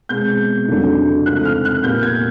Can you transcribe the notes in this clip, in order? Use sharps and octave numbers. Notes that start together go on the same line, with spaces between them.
B2 G#3 C4 G6
F2 C#3 F#3 A3 D4
G#2 F3 A3 C4 D#4 F#6
F6
F#6
A#2 G3 B3 G6
G#6